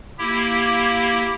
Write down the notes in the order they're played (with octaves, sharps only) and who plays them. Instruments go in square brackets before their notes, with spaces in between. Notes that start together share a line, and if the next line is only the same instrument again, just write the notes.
[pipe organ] A#3 E4 G4